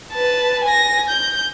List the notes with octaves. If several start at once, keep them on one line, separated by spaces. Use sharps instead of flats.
B4 A5
G#5 A#6
G6